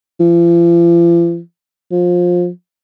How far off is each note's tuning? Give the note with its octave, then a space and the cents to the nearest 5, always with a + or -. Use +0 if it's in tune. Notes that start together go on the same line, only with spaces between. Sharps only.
F3 -45
F3 +20